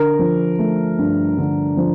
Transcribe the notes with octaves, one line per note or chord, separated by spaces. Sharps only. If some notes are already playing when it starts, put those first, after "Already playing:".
Already playing: D3 A#4
F3
A3
G2
D3
F3